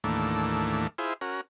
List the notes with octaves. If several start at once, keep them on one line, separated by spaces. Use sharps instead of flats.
D#2 A2 E3 A3 A#3 D4
E4 F4 G#4 C5
C#4 F#4 A#4